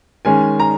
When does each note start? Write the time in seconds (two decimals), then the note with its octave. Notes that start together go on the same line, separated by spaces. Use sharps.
0.25 D#3 G#3 C#4 G#5
0.60 A#5